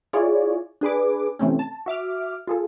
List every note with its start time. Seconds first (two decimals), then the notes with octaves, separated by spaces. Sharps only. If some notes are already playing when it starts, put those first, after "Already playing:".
0.13 E4 F4 G#4 C#5 D5
0.81 D4 G#4 B4 D6
1.39 C3 E3 A3 C4 C#4
1.59 A5
1.86 F#4 E5 D6 F6
2.47 F4 G#4 A4